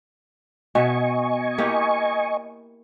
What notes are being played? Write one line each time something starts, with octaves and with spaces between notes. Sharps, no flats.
B2 D#5 E5 G#5 C#6
A#3 E4 G4